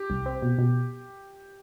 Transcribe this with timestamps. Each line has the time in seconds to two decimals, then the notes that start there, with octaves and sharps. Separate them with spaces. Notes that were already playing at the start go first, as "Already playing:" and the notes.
Already playing: G4
0.10 C2
0.26 C4
0.42 B2
0.58 B2